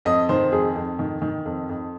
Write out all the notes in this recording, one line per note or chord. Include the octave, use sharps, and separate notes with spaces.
F2 D#5
D#3 C5
F2 G#4
F2
D#3
D#3
F2
F2